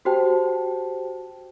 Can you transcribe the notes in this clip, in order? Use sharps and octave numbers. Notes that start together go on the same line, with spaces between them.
F#4 G4 C5 G5 A5